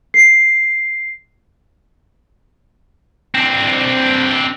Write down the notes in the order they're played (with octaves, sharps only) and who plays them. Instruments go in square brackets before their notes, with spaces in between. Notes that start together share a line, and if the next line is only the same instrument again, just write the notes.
[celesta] C7
[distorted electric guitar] C4 D4